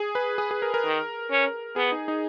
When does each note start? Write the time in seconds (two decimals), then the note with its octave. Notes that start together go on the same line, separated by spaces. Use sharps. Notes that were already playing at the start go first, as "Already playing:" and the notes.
Already playing: G#4
0.15 B4
0.38 G#4
0.51 G#4
0.62 A#4
0.74 A#4
0.85 D#3
1.31 C#4
1.76 B3 G#4
1.92 D#4
2.08 D#4